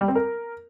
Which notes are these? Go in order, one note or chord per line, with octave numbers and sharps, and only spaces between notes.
G3
C4
A#4